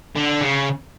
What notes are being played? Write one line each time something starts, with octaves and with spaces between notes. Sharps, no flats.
D3
C#3